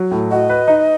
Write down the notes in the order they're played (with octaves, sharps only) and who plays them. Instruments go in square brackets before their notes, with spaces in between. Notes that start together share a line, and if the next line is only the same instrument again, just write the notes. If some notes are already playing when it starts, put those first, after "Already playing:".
Already playing: [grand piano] F#3
A2
[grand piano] F#4 [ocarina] D#5
[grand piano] B4
D#4